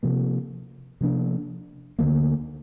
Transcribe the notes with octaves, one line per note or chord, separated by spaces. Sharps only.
C3 F3 A#3
C3 F3 A#3 D4
D2 D3 F3 A#3